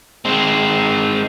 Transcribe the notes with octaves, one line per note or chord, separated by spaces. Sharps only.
G#3 C4